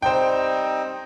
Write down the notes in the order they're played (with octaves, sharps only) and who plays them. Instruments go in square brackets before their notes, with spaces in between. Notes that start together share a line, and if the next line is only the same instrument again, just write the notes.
[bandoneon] G3 C4 D#4 [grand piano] C5 G5